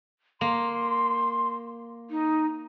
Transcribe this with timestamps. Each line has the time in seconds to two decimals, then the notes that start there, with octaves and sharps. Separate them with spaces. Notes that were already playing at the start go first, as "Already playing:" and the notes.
0.41 A#3 C6
2.10 D#4